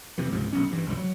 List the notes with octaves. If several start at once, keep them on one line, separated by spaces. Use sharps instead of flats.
F2 C3 E3
C#2 G#2 C3 F3
D#1 B1 C#4
G2 E3
G1 C2 F3 G3
F#3